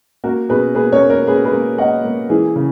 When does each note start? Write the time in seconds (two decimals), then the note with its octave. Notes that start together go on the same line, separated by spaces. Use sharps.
0.24 A#3 F#4 A#4
0.49 B2 G#4 B4
0.75 A#3 G#4 B4
0.92 A#4 C#5
1.01 A#3
1.10 A#4 C#5
1.27 A#3 G#4 B4
1.45 G#4 B4
1.52 A#3
1.78 A#3 D#5 F#5
2.04 A#3
2.29 E3 E4 G#4
2.56 C#3